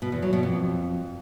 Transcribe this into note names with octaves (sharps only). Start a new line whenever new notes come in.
B2
E2
F#3
B2
F2